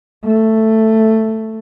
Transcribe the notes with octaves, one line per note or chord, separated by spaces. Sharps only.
A3